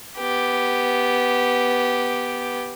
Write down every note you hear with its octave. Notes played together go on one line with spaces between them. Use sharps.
B3 G4